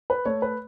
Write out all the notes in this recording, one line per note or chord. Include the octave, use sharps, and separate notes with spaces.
B4
A3 C#5
B4